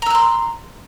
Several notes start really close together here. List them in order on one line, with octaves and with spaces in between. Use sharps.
A#5 E6 F#6 C6